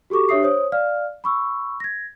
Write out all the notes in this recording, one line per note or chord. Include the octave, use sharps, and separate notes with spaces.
F#4 G4 A4 C#6 D6
D4 G4 C#5 E5 D#6 C7
C5 C#5 D#6
D5 F5 F6
B5 C#6 E6
G#6 A#6